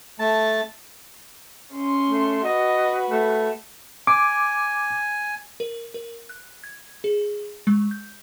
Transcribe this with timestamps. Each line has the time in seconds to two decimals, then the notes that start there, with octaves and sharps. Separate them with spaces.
0.19 A3 A5
1.73 C#4 C6
2.07 A3
2.45 F#4 B4 D#5
3.09 A3
4.07 G#5 D6
5.60 A#4
5.94 A#4
6.29 F#6
6.64 G#6
7.04 G#4
7.67 G#3
7.91 G6